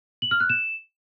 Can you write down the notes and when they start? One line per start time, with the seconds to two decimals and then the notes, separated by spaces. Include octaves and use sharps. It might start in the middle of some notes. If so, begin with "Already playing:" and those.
0.22 F#7
0.31 F6
0.40 F#6
0.50 E7